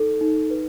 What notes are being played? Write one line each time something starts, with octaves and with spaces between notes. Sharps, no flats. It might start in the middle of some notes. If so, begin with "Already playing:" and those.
Already playing: D#4 A4
D#4
B4